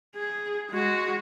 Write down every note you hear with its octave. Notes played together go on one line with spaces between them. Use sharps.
G#4
G#3 F#4